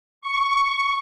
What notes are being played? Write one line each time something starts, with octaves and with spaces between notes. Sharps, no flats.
C#6